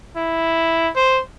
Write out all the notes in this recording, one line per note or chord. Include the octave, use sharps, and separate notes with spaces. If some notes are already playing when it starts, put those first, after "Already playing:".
E4
C5